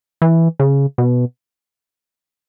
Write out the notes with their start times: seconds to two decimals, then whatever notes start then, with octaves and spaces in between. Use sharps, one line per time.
0.22 E3
0.60 C#3
0.98 B2